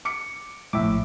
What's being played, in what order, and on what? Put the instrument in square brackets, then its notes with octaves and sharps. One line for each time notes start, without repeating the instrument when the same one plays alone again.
[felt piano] D6 C#7
[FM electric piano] A#1 E5 D6 [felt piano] A2